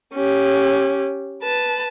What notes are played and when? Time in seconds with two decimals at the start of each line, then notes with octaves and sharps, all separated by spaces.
0.14 C#4 G4
1.43 B4 A5